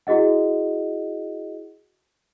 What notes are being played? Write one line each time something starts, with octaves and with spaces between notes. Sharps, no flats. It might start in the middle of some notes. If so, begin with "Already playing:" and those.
E4 F#4 G#4 D#5 F#5